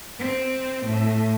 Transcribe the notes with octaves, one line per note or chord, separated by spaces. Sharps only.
C4
A2